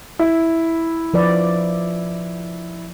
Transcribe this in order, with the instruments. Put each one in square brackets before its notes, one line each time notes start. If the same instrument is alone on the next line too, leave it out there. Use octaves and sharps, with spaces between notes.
[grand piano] E4
[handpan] F3 B4 D5